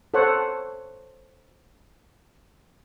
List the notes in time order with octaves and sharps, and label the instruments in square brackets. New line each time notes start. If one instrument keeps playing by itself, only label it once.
[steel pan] A4 C5 C#5 F#5